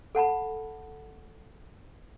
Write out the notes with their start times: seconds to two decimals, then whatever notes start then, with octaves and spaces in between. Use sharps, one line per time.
0.15 A4 F#5 A5 B5